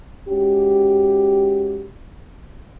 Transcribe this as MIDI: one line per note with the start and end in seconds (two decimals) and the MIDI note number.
0.28 1.87 56
0.28 1.87 61
0.28 1.87 66
0.28 1.87 67